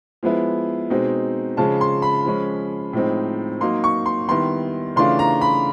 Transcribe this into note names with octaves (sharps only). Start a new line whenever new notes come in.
F3 G#3 B3 E4
B2 G#3 C4 D#4
C#3 F3 G#3 A5
C6
B5
F3 G#3 C#4
A2 F3 G#3 C4 D#4
F#3 A#3 D#4 C6
C#6
C6
D#3 G3 B3 E4 C6
C#3 E3 A3 D4 F4 C6
A#5
B5